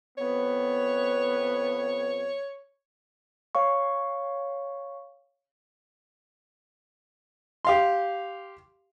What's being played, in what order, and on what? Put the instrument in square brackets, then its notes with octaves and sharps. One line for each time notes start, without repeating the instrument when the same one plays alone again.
[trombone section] F2 B3 [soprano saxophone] C#5
[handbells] C#5 F5 C#6
[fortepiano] G4 F5 C6